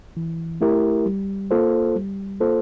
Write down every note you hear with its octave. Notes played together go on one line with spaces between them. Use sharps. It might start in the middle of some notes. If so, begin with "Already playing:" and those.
E3
A3 E4 G4 A#4
G3
A#3 F4 A4 C5
G3
A#3 F4 A4 C5